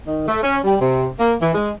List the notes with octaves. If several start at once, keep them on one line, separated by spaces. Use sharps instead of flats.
D#3
A3
C#4
G3
C3
A#3
E3
G#3